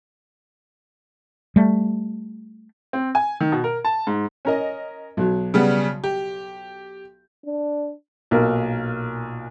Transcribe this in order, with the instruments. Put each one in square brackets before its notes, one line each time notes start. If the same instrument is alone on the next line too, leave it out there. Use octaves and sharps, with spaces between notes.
[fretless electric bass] G3 A3
[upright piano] C4
G#5
D#3
B2
A#4
A5
G#2
[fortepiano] C#4 A#4 D#5
B1 F#3
[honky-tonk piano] C#3 G3 B3
G4
[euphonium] D4
[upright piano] B1 A#2 A#4